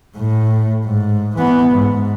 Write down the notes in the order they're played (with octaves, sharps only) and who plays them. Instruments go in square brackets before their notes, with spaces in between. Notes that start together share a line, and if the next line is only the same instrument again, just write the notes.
[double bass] A2
G#2
E3 B3
G#2